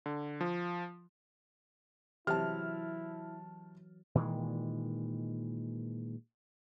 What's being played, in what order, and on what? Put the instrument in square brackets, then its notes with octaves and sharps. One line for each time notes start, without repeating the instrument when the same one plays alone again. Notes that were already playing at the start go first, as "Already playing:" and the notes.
[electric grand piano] D3
F3
[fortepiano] C3 [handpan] E3 F#3 [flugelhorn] E4 [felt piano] A5 F6
[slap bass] A#2 D#3 E3 G#3